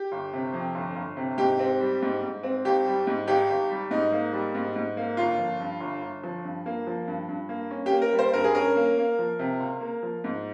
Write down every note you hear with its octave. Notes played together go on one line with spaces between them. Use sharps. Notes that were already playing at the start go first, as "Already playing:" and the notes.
Already playing: G4
G1
C3
F2
G1
G1
C3
G#2 G4
C4
G3
G#2
G#2
C4
G#1 G4
G3
G#2
G#1 G4
G#1
G3
G#2 D#4
A#3
G3
G#2
G#2
A#3
G1 F4
F3
G2
G1
G1
F3
G2
A#3
F3
G2
G2
A#3
C#4
G4
A#3
A#4
G3
C5
G2 A#4
G#4
C#4 A#4
A#3
A#3
F3
C3
C#2
A#3
F3
G#2